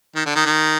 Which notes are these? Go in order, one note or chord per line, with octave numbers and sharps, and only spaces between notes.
D#3
D3
D#3
D#3